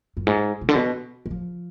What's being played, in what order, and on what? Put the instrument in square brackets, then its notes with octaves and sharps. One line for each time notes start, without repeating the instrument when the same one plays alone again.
[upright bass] F#2
G#2
B2
D3
B2
D#3
F3